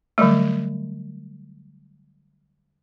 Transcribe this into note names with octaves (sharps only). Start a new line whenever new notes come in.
D3 F#3 G3 A3